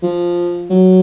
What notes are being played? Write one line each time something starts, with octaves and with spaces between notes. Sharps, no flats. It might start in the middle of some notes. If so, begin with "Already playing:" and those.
F3
F#3